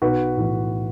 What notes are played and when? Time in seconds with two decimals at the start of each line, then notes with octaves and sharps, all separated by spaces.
0.02 B1 F#4 B4
0.37 A2 E3